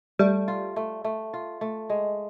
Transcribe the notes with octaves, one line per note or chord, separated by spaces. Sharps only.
G3 A3
F4
A3
A3
F4
A3
G#3